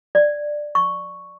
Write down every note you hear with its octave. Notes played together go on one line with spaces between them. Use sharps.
D5
C#6